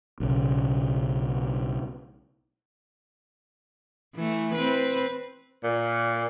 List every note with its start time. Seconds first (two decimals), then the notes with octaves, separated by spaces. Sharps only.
0.20 B1 C#3
4.15 E3 A3
4.55 C4 B4
5.63 A#2